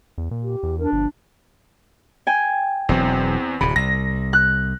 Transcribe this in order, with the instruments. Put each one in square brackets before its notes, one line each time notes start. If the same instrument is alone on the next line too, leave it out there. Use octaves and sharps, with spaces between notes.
[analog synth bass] E2
A#2
[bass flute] G4
[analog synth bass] E2
[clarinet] D4 [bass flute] A#4
[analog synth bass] G1 [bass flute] F3
[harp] G5 G#5
[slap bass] E1 F#3 [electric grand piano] E2 C4
[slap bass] D1 C3 [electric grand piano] B5
[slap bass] C2 [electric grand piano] A#6
[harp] F#6